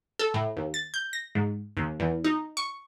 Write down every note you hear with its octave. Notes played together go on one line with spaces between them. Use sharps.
A4
A2
D#2
A6
G6
A#6
G#2
D#2
E2
D#4
C#6